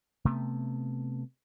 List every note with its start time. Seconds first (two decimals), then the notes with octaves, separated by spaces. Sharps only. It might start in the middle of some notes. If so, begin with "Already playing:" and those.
0.25 C3 A3 B3